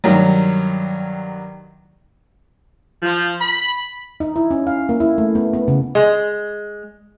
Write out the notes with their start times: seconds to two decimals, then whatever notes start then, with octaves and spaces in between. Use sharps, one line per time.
0.04 G2 D#3 F#3
3.02 F3
3.39 B5
4.20 D#4
4.36 E4
4.51 C#4
4.67 F5
4.89 A#3
5.00 E4
5.18 A3
5.35 B3
5.54 B3
5.68 C#3
5.95 G#3